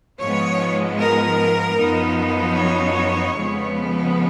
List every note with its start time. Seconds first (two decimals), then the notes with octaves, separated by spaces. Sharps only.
0.19 G#2 F3 G#3 B3 C#5
0.98 A#4
1.77 F#2 F3 B3 D#4
2.55 C#5
3.34 F2 C#3 F3 G#3 B3